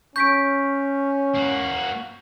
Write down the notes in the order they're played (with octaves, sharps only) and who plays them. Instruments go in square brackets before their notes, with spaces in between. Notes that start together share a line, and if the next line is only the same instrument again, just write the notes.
[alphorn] C#4 [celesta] C#6 B6 D7 [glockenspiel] G6
[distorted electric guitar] A#3 F#4